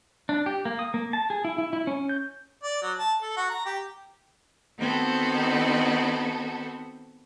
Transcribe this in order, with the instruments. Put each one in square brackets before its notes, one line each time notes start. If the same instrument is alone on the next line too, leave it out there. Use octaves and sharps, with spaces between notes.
[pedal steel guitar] D4
G4
A#3
D#6
A#3
A5
G#4
E4
E4
E4
C#4
G6
[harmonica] D5
F#3
A5
A4
F#4
A#5
G4
[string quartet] D#3 B3 C4 F#4 A4